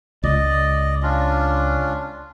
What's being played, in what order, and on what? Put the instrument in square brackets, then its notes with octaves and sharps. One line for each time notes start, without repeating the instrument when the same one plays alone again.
[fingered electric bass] C#2 [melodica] D5 D#5
[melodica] C#4 D4 F4